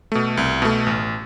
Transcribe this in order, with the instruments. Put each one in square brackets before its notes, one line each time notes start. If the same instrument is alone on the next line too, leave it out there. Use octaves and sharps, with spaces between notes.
[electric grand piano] B2 A3
C2
B2 A3
A1